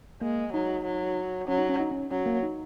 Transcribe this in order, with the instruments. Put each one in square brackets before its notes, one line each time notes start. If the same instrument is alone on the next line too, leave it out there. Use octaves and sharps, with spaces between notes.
[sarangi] G#3 [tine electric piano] A#3
[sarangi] F#3 [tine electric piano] D#4
[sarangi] F#3
[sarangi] F#3 [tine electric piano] C#4
[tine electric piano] D#4
C#4
D#4
C#4
[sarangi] F#3 [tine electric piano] C#4
[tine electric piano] A#3
D#4